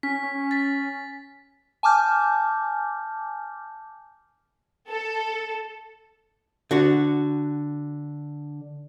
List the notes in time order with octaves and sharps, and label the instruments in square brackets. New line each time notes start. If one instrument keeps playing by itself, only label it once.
[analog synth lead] C#4 [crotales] B6
[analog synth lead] C#4
[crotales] A6 B6
[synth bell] G#5 A5 D6 F6 G6
[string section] A4
[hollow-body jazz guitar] D3 F#4